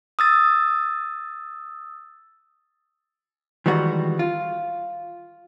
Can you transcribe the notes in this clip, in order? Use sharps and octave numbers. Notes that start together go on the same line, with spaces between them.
D#6 E6 A6
D#3 E3 G3 G#3 F#4
F4